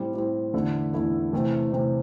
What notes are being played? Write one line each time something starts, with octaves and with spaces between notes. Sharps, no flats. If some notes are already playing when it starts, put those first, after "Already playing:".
Already playing: A2 G3 C4
A2 G3 C4
E2 D3 A3 E4 A4
E2 D3 A3 E4 A4
C3 E3 A3 C4
C3 E3 A3 C4